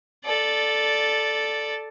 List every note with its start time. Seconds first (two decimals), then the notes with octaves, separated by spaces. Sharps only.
0.25 A4 D5